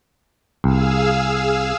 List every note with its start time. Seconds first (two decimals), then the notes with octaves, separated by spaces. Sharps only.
0.64 C2 G#4 F5 E6